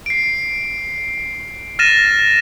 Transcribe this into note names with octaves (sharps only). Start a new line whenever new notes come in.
C7 D7
F6 A6 A#6 D#7 E7